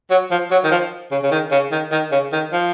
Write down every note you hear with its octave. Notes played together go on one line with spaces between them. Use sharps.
F#3
F3
F#3
D#3
F3
C#3
C#3
D#3
C#3
D#3
D#3
C#3
D#3
F3